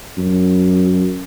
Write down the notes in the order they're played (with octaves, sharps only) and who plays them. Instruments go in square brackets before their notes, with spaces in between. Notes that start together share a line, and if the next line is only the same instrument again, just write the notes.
[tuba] F#2